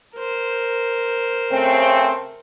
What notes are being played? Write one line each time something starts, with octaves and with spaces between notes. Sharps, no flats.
A#4 C5
C#3 A3 C4